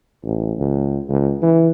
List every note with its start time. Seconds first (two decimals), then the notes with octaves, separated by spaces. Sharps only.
0.24 A1
0.58 C#2
1.09 C#2
1.42 E3